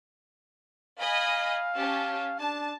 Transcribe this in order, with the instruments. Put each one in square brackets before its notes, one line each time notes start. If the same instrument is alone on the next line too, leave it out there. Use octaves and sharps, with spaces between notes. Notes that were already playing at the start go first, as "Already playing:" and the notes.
[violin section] D#5 G#5 B5 [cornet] F5
[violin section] C#4 G4 A5
[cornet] D4 [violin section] A5